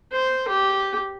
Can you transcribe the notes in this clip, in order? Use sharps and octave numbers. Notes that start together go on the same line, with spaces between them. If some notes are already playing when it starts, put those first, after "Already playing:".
C5
G4